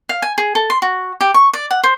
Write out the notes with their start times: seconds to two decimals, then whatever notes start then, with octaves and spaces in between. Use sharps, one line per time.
0.09 F5
0.22 G#5
0.38 G#4
0.55 A4
0.70 C6
0.82 F#4
1.21 G4
1.34 C#6
1.53 D5
1.71 F#5
1.84 C5